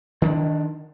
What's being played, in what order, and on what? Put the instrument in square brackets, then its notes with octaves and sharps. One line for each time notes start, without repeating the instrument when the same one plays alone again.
[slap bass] D#3 C4 D4